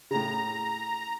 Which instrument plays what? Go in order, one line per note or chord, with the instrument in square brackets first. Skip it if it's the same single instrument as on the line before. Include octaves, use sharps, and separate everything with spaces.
[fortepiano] A2 C#3 [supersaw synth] A#5